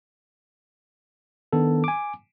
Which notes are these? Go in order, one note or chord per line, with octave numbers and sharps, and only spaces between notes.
D#3 B3 D4 A4
G#5 D6